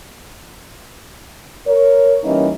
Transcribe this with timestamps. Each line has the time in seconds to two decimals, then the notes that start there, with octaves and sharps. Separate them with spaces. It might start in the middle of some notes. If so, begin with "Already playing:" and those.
1.67 A#4 C#5
2.24 E3 G3 A#3 C#4 D#4